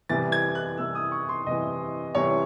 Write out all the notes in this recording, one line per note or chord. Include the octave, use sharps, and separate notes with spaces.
C2 C3 E3 A6
G#6
F#6
C2 C3 E3 E6
D#6
C#6
C6
C2 C3 E3 D#5
C2 C3 E3 C#5